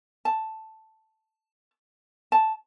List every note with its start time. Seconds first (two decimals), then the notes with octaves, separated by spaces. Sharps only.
0.25 A5
2.32 A5